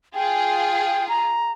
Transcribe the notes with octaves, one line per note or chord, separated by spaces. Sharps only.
F4 G#4 G5
A#5